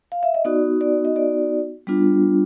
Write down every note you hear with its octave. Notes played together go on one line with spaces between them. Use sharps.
F5
E5
D#5
B3 D#4 F#4 D5
D5
D#5
D5
G3 B3 D4 F4